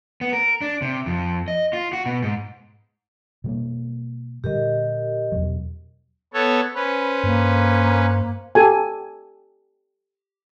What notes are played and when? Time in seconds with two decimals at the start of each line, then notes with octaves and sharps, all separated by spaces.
0.21 B3
0.33 A#4
0.61 D4
0.82 C3
1.06 F2
1.48 D#5
1.73 F4
1.93 F#4
2.06 B2
2.23 G#2
3.44 B2 G3 A#3
4.44 A#2 D3 G3 G4 A#4 D#5
5.32 E2 B2 F#3
6.34 B3 A4 C#5
6.75 C#4 B4 C5 B5
7.24 G2 A#3
8.55 G4 A4 G#5